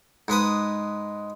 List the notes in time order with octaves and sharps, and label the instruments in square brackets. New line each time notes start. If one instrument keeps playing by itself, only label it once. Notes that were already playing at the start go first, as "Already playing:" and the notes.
[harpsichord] G#2 G#3 B4 D#6